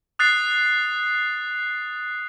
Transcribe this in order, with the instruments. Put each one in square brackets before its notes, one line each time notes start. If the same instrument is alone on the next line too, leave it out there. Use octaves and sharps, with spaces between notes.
[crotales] D#6 F#6 A6 C7